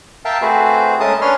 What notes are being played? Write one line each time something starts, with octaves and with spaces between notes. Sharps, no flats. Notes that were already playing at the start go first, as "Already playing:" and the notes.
A#4 E5 F5 G5 A5
A3 C4 F#4 G#4 B4 C5
G#3 A3 C#4 A#4 A5 D#6
C#4 D4 B4 C#5 C6 F6